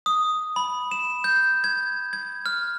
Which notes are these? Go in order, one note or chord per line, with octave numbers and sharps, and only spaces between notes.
D#6
B5
E7
G6
G#6
G#6
F6